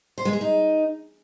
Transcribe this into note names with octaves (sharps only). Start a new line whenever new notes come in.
C5
G#3
G#4
D#4